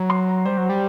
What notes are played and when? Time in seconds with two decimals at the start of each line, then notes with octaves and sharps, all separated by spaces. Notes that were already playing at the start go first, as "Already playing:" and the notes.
Already playing: F#3 A#5
0.10 C6
0.28 A#5
0.45 G3 C5
0.58 F#3
0.69 G3